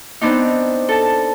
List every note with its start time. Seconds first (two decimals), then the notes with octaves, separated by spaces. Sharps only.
0.21 B3 C4 D4 D#4
0.89 A4 A5